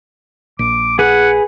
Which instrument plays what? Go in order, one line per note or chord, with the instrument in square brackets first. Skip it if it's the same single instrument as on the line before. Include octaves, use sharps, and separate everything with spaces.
[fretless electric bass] A#1 [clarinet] D6
[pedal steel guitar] G#4 B4 G#5 [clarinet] F#5